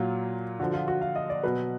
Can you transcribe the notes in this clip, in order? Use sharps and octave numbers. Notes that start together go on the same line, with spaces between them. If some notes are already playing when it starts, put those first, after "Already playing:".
Already playing: A#2 F#3 F4
D3 F3 F#4
F4
F#4
F5
D#5
D5
B2 F#3 B4